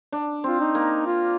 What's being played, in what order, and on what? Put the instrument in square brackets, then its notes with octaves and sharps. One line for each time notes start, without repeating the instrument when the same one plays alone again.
[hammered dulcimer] D4
[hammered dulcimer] C4 [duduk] F4
[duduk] D#4
[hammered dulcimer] A#3
[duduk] F4